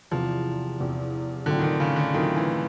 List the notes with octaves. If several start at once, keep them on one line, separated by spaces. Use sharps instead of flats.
E2 C3 E3 F3
E2 C3 E3
A2 D3 F#3 A3 C4 F4
D#3
D3
C#3
D3
A2 D#3 F#3 A3 C4 F4
E3